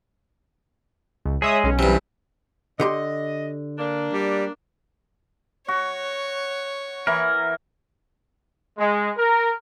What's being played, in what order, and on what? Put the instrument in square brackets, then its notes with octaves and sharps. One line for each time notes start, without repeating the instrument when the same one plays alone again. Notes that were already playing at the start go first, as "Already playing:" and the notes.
[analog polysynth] C#2
[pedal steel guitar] G#3 G#4 [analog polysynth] C#5 E5 D#6
[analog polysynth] B1 C#4
[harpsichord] G2 C3 [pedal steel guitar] E3
[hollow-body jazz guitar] D3 G4 C6 [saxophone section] D#5
[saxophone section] A#3 D4
[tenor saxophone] G3
[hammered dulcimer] F#4 [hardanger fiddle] C#5
[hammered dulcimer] E3 E4 B5 [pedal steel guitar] A#4
[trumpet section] G#3
A#4